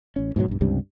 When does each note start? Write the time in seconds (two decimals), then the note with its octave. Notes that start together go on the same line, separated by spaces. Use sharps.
0.16 A1 C#4
0.36 G#2 B2 E3 F#3
0.48 B1 G2
0.61 C#2 G2 C3 G3